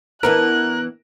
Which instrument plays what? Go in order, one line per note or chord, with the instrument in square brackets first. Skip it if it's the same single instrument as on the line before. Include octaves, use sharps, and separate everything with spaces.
[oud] E3 B3 D4 [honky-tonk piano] A#4 [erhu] F#6